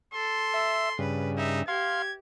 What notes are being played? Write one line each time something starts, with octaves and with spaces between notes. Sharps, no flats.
A4 C6
E5
G2 C#3 B4
D#4 E5
G4 F5 C6 G#6